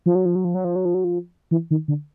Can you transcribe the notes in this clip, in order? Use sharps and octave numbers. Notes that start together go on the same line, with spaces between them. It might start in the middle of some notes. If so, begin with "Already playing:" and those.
F3
F#3
F3
F#3
F3
F#3
F3
F#3
F3
F#3
F3
E3
D#3
D3